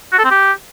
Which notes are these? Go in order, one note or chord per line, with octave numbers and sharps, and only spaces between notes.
F#4
A4
C4
G4